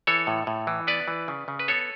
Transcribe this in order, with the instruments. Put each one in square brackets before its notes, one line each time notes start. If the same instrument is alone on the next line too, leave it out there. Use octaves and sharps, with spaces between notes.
[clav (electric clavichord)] E3 A4 C#5
A2
A2
E3
B3 B4 D5
E3
C#3
C#3
B4
B3 A4 C#5